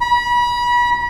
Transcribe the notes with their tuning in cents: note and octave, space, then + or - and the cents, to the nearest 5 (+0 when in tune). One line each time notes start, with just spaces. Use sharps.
B5 -35